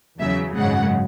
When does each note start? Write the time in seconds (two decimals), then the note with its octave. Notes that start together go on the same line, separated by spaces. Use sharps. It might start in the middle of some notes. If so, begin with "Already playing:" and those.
0.20 E2 C#3 F#3 E5
0.57 G#1 F#2 C#3 G#3 F#5